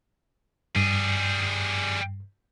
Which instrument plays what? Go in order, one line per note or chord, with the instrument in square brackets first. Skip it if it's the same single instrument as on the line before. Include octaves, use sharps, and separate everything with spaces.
[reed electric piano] G2 [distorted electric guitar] G3 G#4